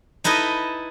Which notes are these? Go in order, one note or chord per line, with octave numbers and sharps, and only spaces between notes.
D#4 E4 A4 B4 D#5